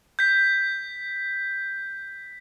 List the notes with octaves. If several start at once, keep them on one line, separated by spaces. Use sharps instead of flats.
G6 B6